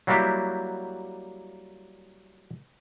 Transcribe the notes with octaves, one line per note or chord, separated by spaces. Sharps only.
F#3 G3 A#3 E4 F#4 G4